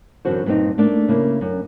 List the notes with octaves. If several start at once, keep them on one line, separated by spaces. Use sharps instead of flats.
F#2 D3 E3 C4 F#4 C5
G2 A#2 A3 B3 C4 D#4
A3 A#3 D4
C#3 A#3 E4
F#2